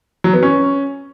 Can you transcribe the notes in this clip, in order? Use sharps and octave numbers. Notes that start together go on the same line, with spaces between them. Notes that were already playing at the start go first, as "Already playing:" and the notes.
F#3
B3
C#4